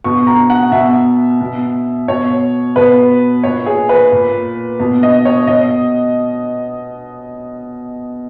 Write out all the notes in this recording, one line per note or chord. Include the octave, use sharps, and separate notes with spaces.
B2 C#6
A#5
F#5
B2 E5
B2
B2 C#5
B2 B4
A#2 C#5
G#4
B4
A#2
B2
D#5
C#5
B2 D#5